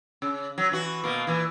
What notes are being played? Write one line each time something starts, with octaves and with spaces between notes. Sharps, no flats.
C#3
F#3
E3 F#4
B2 A#3
A#2 E3